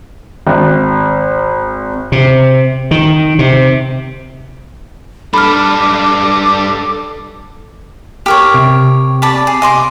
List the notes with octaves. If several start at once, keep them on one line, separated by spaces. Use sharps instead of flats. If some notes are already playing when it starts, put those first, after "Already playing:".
G#1
C3
D#3
C3
G3 D4 A4 B5 D6 F6
G4 A#4 C#5
C3
D5 A5 B5
G#4
D#5 C6 D6